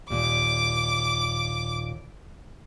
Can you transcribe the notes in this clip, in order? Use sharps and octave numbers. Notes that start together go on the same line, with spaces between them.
D#2 A#2 G3 D6